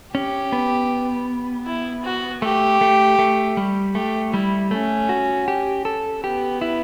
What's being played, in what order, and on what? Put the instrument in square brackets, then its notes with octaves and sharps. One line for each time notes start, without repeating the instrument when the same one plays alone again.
[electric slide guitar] C#4 [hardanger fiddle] G4
[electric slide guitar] B3
[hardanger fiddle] E4
F#4
[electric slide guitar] A3 [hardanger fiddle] G4
[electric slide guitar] A3
A3
G3
[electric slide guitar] A3 [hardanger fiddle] G4
[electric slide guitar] G3 [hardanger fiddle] E4
[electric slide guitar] A3 [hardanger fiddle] C#4
[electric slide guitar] F#4
G4
A4
[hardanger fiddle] B3 [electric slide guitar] G4
[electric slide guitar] E4